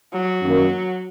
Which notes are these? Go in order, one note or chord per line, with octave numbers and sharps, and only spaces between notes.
F#3
F#2 D#3 A#3